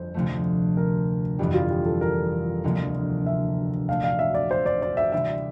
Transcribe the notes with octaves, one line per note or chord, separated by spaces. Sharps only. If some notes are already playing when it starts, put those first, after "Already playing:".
Already playing: G1 F2 C5
D2 C3 F3 A3
A#4
G1 F2 E3 G4
F4
G4
A4
A#4
E1 D2 C3 F3 A#3
E5
A#2 A3 D4 A4 F5
F5
E5
D5
C5
D5
D5
E5
D2 C3 E3 G3 D4 E5